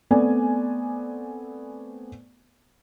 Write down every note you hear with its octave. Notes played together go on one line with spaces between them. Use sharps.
A3 B3 C4 D5 G#5